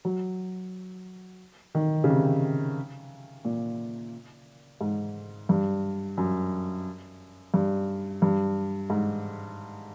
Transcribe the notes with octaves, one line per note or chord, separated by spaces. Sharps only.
F#3
D#3
C#3
C3
A#2
G#2
G2
F#2
G2
G2
G#2